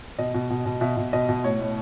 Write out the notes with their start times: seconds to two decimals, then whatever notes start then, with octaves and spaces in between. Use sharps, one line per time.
0.18 B2 D#5
0.34 B2
0.50 B2
0.66 B2
0.81 B2 E5
0.97 B2
1.13 B2 D#5
1.29 B2
1.44 A2 C#5
1.59 A2